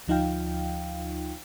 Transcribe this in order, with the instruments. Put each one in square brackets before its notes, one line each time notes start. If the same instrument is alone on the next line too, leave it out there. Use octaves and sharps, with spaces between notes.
[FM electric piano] D2 F3 D#4 F4 F5 G5